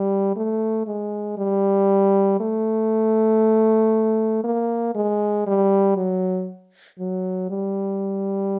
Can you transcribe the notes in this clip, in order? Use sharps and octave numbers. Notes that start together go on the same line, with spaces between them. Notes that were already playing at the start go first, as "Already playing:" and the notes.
Already playing: G3
A3
G#3
G3
A3
A#3
G#3
G3
F#3
F#3
G3